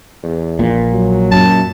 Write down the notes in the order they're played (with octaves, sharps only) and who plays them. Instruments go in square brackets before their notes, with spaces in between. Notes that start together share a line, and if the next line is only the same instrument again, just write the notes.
[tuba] E2
[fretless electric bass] A#1 A#2
[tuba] F#3
[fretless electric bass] F#2 A#2 [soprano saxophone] A5